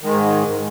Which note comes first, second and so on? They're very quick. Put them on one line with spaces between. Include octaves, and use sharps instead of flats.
D#3 G#3 G#2